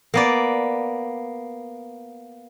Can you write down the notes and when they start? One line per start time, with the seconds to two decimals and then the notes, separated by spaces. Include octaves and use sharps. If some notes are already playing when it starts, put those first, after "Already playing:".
0.14 A#3 B3 D5